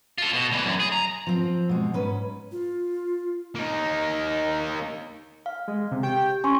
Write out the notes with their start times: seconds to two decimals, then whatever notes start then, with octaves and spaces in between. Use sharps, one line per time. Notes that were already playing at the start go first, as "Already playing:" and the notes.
0.18 F4 A4
0.33 B2
0.52 D2 E3
0.65 F#2
0.80 G#4
0.92 A#5
1.27 F3 C4
1.69 B2 G#3
1.94 G#2 C#4 B4
2.52 F4
3.55 A#3 D#4
5.46 F5
5.68 G#3
5.91 C3
6.03 G4 G5
6.44 C#4 G#5 C6 C#6